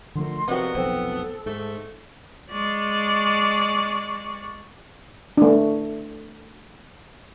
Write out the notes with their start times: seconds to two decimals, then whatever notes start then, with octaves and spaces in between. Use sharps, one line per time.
0.15 D3 F3 A3 A#4 C6
0.48 C3 F3 B3 F#4 A#4 D5 D#5
0.75 F1 B1 F2 C4 A4
1.46 G#2 A3
2.51 G#3 D5 C#6
5.37 A3 D4